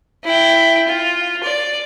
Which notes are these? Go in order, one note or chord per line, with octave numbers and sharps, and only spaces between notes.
E4 G5
F4
D5